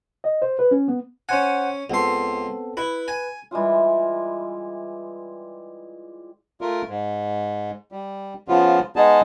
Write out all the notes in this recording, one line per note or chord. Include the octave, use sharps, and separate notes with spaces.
D#5
C5
B4
C#4
B3
C#4 C5 F#5 G#5
C#2 B3 C4 A4 C6
E4 B4
G#5
E3 G3 G#3 F4
A3 F4 A#4
G#2
G3
C#3 F3 B3 F4
G#3 B3 D#4 G#4 D#5 A5